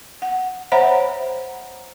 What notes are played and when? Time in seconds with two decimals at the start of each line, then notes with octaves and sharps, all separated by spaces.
0.22 F#5
0.72 C5 C#5 E5 F#5 A#5 B5